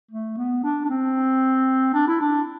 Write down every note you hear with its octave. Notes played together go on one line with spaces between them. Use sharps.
A3
B3
D4
D4
C4
D4
E4
D4